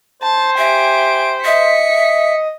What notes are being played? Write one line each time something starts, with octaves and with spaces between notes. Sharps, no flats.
C5 A5
G4 E5 G#5 D7
D#5 E5 B6 C#7